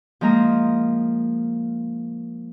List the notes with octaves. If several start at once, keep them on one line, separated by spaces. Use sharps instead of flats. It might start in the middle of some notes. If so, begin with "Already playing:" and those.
F3 G#3 A#3 A#5 D#6